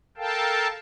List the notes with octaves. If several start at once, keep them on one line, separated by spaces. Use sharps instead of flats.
A4 A#4 F5 G5 A5